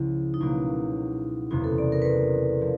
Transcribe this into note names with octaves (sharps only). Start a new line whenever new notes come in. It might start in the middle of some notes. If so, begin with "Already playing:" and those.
Already playing: C#2 C#3 F3 E4
D#4
C#2 B2 F#3 A#3 E4
F#1 E2 C3 E4
A4
D5
A#4
B4
A#4
F3